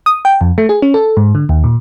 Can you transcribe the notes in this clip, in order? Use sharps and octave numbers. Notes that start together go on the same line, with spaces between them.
D#6
G5
F2
A3
G#4
C#4
A4
G#2
D3
D#2
A#2